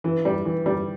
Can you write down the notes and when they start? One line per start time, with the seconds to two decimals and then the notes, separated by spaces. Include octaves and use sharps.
0.04 E3
0.25 G3
0.45 E3
0.66 G3